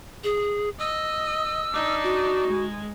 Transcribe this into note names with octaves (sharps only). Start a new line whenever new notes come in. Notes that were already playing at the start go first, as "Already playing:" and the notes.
G#4
D#5 E6
D4 D#4
F#4
G#3